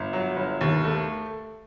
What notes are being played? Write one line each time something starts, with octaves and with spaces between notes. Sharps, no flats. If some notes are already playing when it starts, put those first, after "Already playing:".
Already playing: G1
F#3
G1
D#2
A3